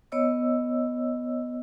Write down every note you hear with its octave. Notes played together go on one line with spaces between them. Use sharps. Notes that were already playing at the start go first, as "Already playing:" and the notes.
B3 C#5 D#5 E6